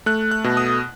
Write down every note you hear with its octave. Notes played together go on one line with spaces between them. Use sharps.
A3 F#6
F#6
B2
D#6